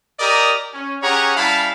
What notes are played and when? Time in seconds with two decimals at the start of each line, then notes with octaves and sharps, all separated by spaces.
0.20 G4 A#4 D5 D#5 A#5 D#6
0.74 C#4
1.03 C#4 G4 G#4 C#5 F#5 A#5
1.37 G3 C#4 E4 F5 A5 B5